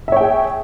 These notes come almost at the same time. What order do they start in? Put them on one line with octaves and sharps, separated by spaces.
E5 C#5 G5 G#4